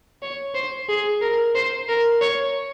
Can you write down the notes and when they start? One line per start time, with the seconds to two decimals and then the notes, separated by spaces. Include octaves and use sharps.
0.22 C#5
0.55 C5
0.89 G#4
1.21 A#4
1.55 C5
1.88 A#4
2.21 C#5